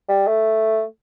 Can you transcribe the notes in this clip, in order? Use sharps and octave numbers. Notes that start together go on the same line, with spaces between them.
G3
A3